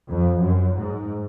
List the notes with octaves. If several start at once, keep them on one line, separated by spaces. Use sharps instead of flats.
F2
F#2
G#2